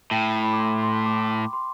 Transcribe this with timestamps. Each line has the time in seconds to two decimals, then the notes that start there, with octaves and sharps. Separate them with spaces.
0.11 A2 G5
0.35 B5
0.53 D6
0.59 C6
0.82 C6
1.06 D6
1.53 C6